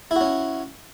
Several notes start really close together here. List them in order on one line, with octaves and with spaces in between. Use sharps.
E4 F#4 C#4